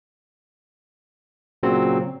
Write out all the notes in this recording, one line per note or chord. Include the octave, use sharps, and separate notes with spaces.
A#2 C#3 F#3 C4